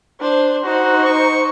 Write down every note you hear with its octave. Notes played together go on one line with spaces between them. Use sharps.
D4 C5
D#4 F#4 C5
C#6